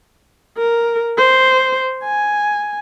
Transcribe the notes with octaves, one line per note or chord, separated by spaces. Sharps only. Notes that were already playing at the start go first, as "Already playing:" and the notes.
A#4
C5
G#5